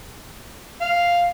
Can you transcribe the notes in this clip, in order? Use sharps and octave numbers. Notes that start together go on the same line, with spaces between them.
F5